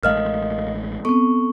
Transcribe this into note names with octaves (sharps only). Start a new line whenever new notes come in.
A1 G#3 A3 A#4 D#5 F5 F6
B3 C4 A4 C#6